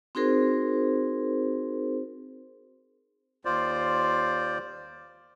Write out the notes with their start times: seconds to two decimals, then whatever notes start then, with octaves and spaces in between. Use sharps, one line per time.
0.15 C4 D#4 F#4 G#4 A#4 C5
3.45 D#2 F4 C5 D5